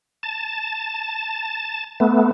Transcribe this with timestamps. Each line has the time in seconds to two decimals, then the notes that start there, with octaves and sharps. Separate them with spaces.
0.23 A5
2.00 A3 B3